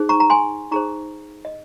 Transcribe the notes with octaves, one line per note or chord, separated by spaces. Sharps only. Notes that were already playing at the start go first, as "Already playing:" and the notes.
Already playing: D#4 G#4 C5
A#5 C#6
A#5
G#5 C6
D#4 G#4 C5 A#5 C#6
D#5